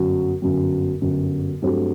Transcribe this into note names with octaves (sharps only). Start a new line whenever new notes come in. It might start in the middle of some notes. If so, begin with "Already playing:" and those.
Already playing: G1 F#2 F#3
G1 F#2 F#3
G1 F#2 F#3
G2 F#3 A3 C4 G4